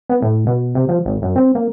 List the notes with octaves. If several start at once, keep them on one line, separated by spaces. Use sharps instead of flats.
B3
A2
B2
C3
F3
G#1
F#2
C4
A#3